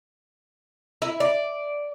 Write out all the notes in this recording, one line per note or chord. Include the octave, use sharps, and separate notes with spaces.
E4
D5